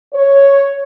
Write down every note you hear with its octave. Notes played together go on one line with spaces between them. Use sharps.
C#5